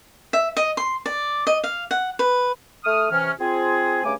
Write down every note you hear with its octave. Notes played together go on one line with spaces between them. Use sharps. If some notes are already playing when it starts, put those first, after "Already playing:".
E5
D#5
C6
D5
D#5
F5
F#5
B4
A3 D#6 F6
C3 E3 C#4 F6
C4 F4 G#4
G2 C#3 A3 G#5 D6